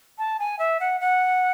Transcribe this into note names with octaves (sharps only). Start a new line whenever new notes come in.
A5
G#5
E5
F#5
F#5